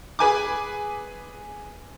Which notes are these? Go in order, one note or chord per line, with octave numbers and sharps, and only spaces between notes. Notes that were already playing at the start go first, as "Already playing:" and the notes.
G#4 B4 G#5 D6